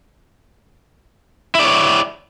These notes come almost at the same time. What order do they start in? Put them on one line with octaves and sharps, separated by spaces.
E4 D5 C#5